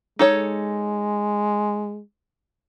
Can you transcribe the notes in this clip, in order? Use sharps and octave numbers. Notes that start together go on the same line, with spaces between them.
G#3 D#4 A4 C#5